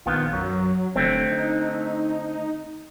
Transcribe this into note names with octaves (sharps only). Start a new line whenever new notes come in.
A#1 D#3 B3 F4
F#2 F#3
F1 D3 A3 C4
D#4